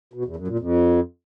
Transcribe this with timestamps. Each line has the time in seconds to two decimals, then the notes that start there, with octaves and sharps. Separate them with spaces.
0.13 B2
0.25 E2
0.36 F#2
0.48 A#2
0.59 F2